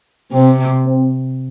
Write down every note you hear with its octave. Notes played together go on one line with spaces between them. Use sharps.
C3 C4
C4